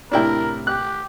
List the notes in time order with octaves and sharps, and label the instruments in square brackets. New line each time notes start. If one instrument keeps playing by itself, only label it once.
[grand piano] A2 C3 [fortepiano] D4 E4 G5 [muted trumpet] A#4
[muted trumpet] G4 [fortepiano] F#6